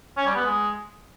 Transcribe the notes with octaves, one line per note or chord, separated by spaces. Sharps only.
C#4
G3
B3
G#3